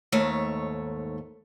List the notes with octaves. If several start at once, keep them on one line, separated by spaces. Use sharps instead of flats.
D#2 G#2 A3 C#5